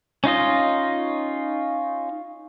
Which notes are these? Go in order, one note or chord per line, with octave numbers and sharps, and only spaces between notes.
C#4 D#4 F4 D#5